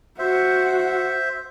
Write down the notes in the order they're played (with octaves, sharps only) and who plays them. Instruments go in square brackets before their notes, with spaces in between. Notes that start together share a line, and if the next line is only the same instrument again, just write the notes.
[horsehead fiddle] F#4 [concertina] C5 E5